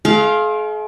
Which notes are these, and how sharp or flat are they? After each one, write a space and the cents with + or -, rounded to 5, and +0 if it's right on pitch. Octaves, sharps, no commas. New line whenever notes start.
G#3 +45 F5 +0